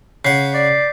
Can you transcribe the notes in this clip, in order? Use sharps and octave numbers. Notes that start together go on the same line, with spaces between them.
C#3 F#5 G6 B6 C7
D5